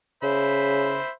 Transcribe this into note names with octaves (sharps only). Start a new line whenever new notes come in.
C#3 C5 E5 B5